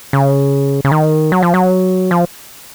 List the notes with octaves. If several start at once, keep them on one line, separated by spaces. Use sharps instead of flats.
C#3
C#3
D#3
F#3
F3
F#3
F3